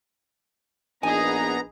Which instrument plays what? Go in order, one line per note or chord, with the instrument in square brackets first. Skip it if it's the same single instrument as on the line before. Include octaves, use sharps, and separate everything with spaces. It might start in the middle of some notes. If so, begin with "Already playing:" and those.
[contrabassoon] A#1 [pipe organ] B3 A#5 [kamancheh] D#4 G#4 [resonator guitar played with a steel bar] G#5